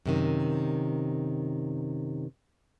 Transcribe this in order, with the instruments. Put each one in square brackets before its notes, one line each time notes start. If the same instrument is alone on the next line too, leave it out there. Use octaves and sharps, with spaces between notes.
[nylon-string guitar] F#2 C3 D#3